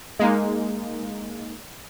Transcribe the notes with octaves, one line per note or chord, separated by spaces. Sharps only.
G#3 A#3 D#4